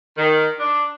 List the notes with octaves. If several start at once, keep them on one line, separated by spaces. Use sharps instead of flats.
D#3
D4